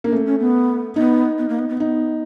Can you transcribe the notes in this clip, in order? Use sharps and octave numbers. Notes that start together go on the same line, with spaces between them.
A#3 D4
A3 C#4
C#4
B3
B3 D#4
B3
A#3
B3
B3
D#4